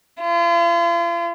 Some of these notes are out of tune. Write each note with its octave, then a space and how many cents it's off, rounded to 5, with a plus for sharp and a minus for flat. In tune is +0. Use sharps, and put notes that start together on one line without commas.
F4 -40